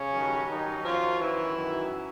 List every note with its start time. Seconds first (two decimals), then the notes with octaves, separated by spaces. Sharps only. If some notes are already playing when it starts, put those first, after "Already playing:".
Already playing: C#3 C#4
0.13 G2 D#3 F#3
0.48 D#3 D#4
0.84 F#2 D#3 F3 F#3 F4
1.20 E3 E4
1.56 F#2 D#3 F#3